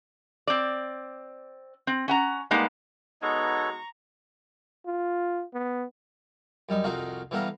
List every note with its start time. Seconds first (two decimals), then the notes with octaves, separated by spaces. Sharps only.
0.47 C4 D5
1.87 C4
2.08 C#4 F#5 A#5
2.51 G3 G#3 A#3 B3 D#4
3.22 B2 G#3 B3 D#4 A4 C#5 A#5 C#6
4.87 F4
5.54 B3
6.69 F#2 G3 D#4
6.84 C2 F2 D#4 F#4 F5 A#5
7.31 E3 G3 B3 A4 F5 A#5